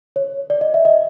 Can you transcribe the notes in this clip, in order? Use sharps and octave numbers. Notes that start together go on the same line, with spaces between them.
C#5
D5
D#5
E5
D#5